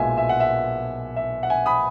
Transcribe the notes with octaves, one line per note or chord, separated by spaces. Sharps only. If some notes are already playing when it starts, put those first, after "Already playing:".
Already playing: B1 A#2 G#3 E5 G#5
E5
F#5
E5
E5
F#5
E5 G#5
B5 D#6